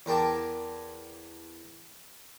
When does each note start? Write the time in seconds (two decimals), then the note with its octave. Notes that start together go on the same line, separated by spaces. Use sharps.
0.06 E2 A#4 G5 A5 D6